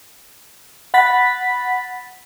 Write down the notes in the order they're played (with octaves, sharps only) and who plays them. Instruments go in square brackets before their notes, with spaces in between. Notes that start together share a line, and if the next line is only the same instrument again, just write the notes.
[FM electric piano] F#5 B5 A6 B6